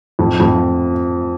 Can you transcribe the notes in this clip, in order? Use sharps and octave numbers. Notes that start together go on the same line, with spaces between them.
F2
F2